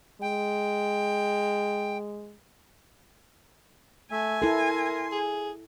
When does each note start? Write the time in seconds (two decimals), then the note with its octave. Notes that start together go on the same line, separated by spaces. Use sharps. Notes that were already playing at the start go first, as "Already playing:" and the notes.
0.21 G#3 G5
4.11 A3 E5 G#5
4.42 E4 A4 A#4 C6
5.12 G#4